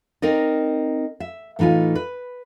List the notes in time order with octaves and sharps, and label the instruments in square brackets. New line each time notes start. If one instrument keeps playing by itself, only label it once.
[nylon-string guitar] C4 D#4 A#4 D5 D#5
E5
A2 E3 D#4 F4 G#5
B4